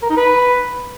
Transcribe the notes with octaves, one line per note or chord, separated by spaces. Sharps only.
A#4
D#4
B4